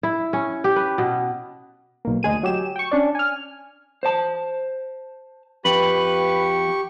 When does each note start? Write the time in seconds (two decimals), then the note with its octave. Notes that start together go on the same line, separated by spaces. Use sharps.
0.03 E4
0.33 C#4
0.64 G4
0.76 B4
0.98 B2
2.05 B1 A#3
2.23 D2 G#3 G#4 D#7
2.43 F#3 G4 E7
2.76 G5 C#6
2.91 C#4 D4 D5
3.15 G#5 F6
4.03 C5 A5
5.65 F2 G4 B4 C#6